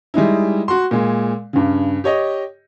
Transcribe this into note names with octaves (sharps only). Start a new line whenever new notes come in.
G3 G#3 D#4 E4
F#4 C6
A#2 G#3
G2 C#3
G4 C#5 D#5